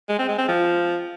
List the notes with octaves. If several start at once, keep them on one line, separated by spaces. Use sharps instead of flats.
G#3
C4
G#3
C4
F3